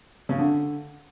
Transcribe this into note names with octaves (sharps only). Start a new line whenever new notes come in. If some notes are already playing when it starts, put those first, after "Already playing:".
C#3
D3